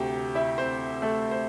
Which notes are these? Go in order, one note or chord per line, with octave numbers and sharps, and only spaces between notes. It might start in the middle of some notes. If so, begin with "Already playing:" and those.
Already playing: D2 C3 A3 G4 G5
E4 E5
C4 C5
A3 A4
C5